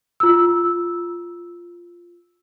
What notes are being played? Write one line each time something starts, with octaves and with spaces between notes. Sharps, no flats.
F4 E6